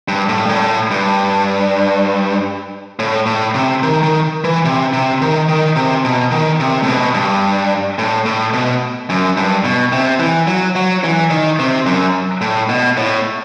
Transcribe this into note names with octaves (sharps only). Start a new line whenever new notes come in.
G2
A2
G2
A2
G2
A2
A2
C3
D#3
D#3
E3
C3
C3
D#3
D#3
C3
B2
D#3
C3
A2
B2
G2
A2
A2
B2
F#2
G2
B2
C3
E3
F#3
F#3
E3
D#3
C3
F#2
A2
B2
A2